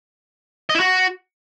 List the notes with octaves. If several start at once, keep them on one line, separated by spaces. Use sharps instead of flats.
D#5
E4
F#4